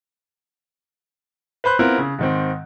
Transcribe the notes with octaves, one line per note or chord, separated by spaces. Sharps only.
B4 C5 B5 F#6
B3 C4 E4 F4 A#4
C#3
G#2 D#3 C4